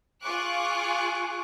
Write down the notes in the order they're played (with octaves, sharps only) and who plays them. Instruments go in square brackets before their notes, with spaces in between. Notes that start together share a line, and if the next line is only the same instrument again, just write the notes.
[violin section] F4 G#4 C#6 D6 F#6